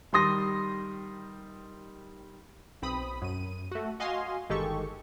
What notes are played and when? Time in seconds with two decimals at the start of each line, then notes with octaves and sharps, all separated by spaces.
0.13 D#3 G3 C6 D#6 A#6
2.82 B1 C4 B5 D#6
3.22 F#2 D#7
3.71 A3 F#4
4.00 F#4 D#5 F5 G#5 C6
4.49 G1 D#3 G#3 G4 A4 C#6